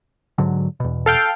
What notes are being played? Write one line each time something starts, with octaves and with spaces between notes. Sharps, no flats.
G#2 D3 F#3
E2 B2
A4 F5 G5